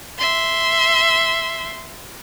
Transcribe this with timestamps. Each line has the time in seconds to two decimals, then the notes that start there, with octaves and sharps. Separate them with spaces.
0.18 E5 C6